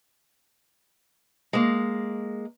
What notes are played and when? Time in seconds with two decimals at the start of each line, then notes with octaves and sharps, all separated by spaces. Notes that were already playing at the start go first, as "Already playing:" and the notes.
1.53 G#3 A#3